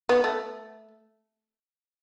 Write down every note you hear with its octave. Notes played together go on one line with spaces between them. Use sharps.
B3
A3